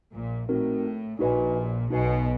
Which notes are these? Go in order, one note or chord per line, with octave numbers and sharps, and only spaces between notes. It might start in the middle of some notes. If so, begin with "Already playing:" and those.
A#1 A#2
A2 C4 D#4 F#4 A#4
A#1 A#2 D#4 F#4 B4 D#5 G#5
B1 B2 D#4 F#4 B4 D#5 G#5